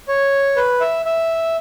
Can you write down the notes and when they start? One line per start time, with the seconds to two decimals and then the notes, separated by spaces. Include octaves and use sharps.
0.08 C#5
0.56 B4
0.81 E5
1.06 E5